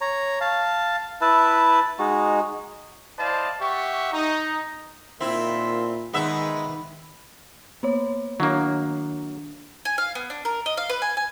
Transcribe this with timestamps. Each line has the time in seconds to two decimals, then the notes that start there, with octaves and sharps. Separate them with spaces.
0.01 C#5 A#5
0.41 F5 A5
1.21 E4 B4 E5 A5
1.99 G#3 D#4 F#4
3.19 E4 C5 D5 D#5 F5 A5
3.62 G4 E5 F#5 C#6
4.13 D#4
5.21 A#2 D#3 C4 E4 F4 E5
6.13 G#2 D#3 G#3 B3 E5
7.83 A#3 B3 C#5
8.40 D#3 F#3 A#3 D4
9.85 G#5
9.98 F5
10.15 B3
10.30 D4
10.45 A#4
10.66 D#5
10.77 F5
10.90 B4
11.02 G#5
11.17 G#5